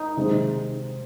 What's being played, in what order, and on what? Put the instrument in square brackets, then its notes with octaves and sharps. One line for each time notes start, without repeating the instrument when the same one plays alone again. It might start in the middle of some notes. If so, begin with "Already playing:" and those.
Already playing: [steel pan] D#4
[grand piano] C3 D#3 G#3 C4